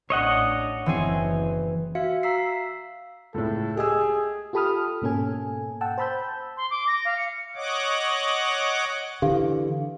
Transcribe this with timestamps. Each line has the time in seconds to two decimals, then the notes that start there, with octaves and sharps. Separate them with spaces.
0.10 A1 D4 C#5 D#5 F#5
0.86 F#1 E3 C4 G#4
1.95 F#4 E5 F5 C#7
2.23 F5 A#5 E6 B6 C7
3.34 C#2 A2 A4
3.77 G4 G#4 D#5 E6
4.53 F4 G4 A4 B5 D#6 F6
5.02 G#2 B2 A#3 C#4 A4 G#5
5.81 F#5 G5 A5 E6
5.98 C5 A5 B5 E6 G6
6.57 C6
6.71 D6
6.88 A#6
7.05 F5
7.17 C#7
7.56 C#5 D#5 F#5 D6
9.22 D3 E3 G4 F5